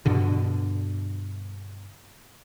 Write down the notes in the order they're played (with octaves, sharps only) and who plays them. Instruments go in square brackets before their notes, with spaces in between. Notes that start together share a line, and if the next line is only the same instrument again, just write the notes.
[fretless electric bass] G2 B2 D3